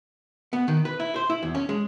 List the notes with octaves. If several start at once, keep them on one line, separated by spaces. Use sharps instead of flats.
B3
D#3
B4
E4
C5
E4
E2
C#4
G#3